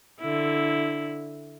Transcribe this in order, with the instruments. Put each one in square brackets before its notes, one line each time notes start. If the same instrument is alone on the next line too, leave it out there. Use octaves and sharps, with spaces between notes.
[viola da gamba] D3 E4